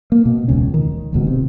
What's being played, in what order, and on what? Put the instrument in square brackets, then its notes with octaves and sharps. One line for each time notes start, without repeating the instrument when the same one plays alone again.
[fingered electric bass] A#3
B2
E1 C#2 C#4
D#3
D1 C#2 B2
C3